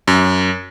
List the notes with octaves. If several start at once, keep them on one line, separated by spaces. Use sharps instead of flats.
F#2